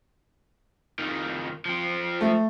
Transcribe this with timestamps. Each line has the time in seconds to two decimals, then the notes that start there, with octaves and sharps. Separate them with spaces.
0.99 F2 D#3
1.65 F3 C4
2.21 A3